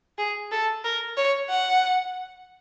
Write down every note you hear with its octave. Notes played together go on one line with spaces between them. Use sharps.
G#4
A4
A#4
C#5
F#5